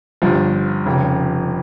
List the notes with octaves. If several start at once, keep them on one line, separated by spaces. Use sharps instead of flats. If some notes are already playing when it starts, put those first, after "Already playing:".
G1 G2 F3
F1 F2 C#3